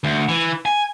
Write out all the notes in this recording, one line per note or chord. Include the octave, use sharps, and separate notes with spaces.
D2
E3
G#5